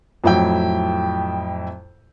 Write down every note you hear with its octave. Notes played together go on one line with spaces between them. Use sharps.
F2 A2 F#3 E4 E5 G5